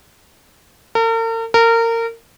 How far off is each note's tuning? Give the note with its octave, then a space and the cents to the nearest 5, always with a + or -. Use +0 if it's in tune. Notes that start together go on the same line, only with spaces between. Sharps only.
A#4 -45
A#4 -25